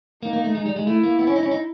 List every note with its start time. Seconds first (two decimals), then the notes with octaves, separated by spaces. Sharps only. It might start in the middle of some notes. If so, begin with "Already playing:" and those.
0.23 A#3 D#4
0.33 A#3
0.44 A3
0.55 G#3
0.66 G3
0.76 G#3
0.87 A3 E4
1.03 A#3
1.19 B3
1.27 C#4
1.36 D#4
1.43 C#4
1.51 D#4